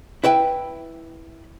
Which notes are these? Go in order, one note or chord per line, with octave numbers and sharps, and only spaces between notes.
E4 B4 E5 G5